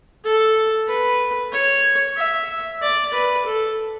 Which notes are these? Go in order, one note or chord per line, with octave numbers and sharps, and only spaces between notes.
A4
B4
C#5
E5
D5
B4
A4